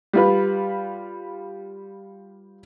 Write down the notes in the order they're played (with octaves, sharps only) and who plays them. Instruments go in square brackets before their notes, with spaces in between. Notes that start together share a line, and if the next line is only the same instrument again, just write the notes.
[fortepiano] G3 F4 B4